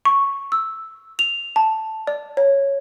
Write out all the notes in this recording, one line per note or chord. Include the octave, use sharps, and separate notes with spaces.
C#6
E6
F7
A5
D5
C#5